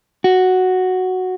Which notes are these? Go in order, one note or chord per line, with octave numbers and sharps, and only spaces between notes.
F#4